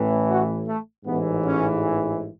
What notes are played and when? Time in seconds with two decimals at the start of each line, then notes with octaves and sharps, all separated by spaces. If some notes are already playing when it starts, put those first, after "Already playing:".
Already playing: A1 A2 E3
0.29 F#4
0.66 A3
1.06 A1 G#2 E3 B3
1.44 C#4